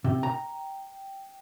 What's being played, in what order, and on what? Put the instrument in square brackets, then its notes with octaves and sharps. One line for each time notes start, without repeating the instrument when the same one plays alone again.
[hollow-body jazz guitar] C3 [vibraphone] G5
[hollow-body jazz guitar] A#5